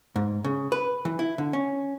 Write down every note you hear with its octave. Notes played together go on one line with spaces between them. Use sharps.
G#2
C#3
B4
E3
E4
D3
C#4